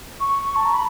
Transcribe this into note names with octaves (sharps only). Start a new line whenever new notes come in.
C#6
A5
A#5
B5